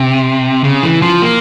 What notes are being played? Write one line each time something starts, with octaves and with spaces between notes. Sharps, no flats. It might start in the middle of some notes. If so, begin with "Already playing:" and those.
Already playing: C3
C#3
E3
F3
A#3